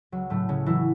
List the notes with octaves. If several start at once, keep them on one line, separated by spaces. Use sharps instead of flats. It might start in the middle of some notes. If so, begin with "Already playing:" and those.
C#2 F#3
A2 C#3 F#3 A3
C#2 C#3 C#4
C#3 E3 F#3 E4